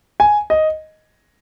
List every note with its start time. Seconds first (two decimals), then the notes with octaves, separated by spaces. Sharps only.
0.20 G#5
0.50 D#5